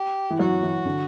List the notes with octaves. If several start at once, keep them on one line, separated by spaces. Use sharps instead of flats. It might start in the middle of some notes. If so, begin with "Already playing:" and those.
Already playing: G4
E3
F#3 F#4
E3
D3